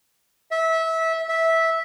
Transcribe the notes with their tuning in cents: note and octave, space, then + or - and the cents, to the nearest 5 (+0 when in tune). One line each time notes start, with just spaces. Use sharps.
E5 -20
E5 -10